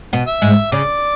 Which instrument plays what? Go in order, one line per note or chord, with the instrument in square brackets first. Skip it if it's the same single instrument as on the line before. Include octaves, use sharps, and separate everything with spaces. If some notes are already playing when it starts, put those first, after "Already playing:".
[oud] B2 B3
[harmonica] E5
[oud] G#2 G#3
[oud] C#3 [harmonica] D5